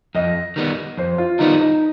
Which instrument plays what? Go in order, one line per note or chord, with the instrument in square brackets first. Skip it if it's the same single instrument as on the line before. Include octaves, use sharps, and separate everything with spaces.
[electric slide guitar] F2 [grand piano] D#5
[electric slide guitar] D#3 G3 B3
[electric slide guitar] F2 [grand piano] C5
[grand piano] F4
[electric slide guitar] D#3 G3 B3 [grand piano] D#4
[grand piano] D#4